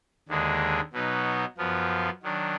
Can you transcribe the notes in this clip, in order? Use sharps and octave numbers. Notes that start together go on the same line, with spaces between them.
D#2 D3 G#3 D4
B2 F#3 B3 D#4
F#2 F3 B3 F4
D#3 F#3 D4